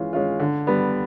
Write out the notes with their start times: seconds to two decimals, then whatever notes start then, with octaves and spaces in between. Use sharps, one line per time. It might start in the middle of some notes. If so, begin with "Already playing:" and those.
Already playing: E3 G#3 C#4 F4
0.13 G#3 C#4 F4
0.39 D3
0.67 G3 B3